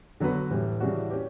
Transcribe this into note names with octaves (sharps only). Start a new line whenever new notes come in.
D3 F#3 B3 F#4 B4
A2 E3 G3
C#3 E3 G3 D4 F#4
C#4 G4